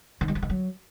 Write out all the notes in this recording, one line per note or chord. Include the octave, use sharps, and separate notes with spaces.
D#3
G3
F3
D#3
F#3